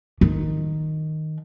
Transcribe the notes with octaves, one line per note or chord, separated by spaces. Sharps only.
D#3